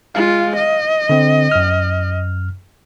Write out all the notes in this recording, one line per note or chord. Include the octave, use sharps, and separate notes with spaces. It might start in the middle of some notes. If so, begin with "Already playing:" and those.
G#3 F4 F5
D#5
D3 C4
F#2 F6